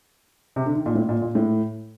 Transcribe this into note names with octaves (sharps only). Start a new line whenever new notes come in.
C3
D3
D#3
A#2
A2
A#2
A#2
A2